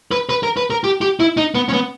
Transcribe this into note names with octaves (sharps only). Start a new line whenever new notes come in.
B4
B4
A#4
B4
A#4
G4
G4
E4
D#4
B3
C#4
B3